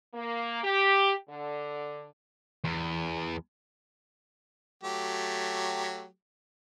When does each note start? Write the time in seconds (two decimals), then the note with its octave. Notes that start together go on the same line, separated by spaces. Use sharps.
0.15 A#3
0.64 G4
1.30 D3
2.64 E2
4.83 F#3 A3 G4